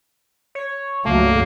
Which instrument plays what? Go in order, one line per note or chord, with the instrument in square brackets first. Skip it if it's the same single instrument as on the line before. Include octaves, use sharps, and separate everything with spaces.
[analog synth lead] C#5
[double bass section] C#2 G2 F#3 [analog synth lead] A3 [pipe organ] A#3